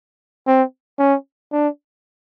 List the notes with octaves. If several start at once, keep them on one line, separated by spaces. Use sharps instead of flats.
C4
C#4
D4